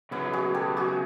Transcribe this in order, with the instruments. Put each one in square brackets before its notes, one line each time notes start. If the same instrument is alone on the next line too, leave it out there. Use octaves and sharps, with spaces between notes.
[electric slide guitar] C#3 F#3 B3 [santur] E4
[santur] F#4 G#4
G4 A4
F#4 G#4